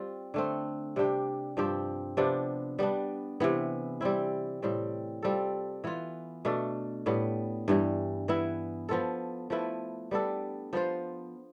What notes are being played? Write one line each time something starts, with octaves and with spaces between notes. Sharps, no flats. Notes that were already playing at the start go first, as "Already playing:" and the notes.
Already playing: G3 C4 F4
D3 A3 C4
C3 G3 D4 G4
G2 F3 C4 G4
C3 F3 B3 D4
G3 B3 D4
C3 E3 B3
G3 C4 E4
A2 G3 C4
G3 C4 F4 A4
E3 B3 F4
B2 A3 D4 A4
A2 G3 B3
G2 E3 G3
E3 B3 E4
F3 B3 F4 A4
F3 A3 E4 B4
G3 B3 D4 A4
F3 B3 F4 C5